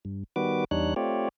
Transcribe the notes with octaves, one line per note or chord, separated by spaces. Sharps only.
G2
D#3 G3 B3 F#4 B4 D6
E2 G3 D4 D#4 C#5 F#6
A3 C4 F4 G4 C#5 D5